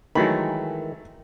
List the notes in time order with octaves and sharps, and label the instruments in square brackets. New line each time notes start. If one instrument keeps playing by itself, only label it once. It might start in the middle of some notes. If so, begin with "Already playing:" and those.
[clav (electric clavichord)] D#3 E3 G#3 [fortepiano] F#3 A3 B5